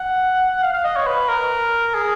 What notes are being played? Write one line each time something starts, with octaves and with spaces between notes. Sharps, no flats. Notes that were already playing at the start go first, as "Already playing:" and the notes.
Already playing: F#5
F5
F5
D#5
C#5
B4
A#4
G#4